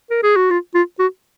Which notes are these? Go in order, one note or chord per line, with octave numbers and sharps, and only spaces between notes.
A#4
G#4
F#4
F4
F4
F#4